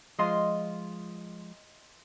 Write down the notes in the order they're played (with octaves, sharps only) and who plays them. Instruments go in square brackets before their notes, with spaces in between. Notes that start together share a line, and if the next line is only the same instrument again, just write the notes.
[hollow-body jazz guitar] F3 G#3 F4 [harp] D#5 C6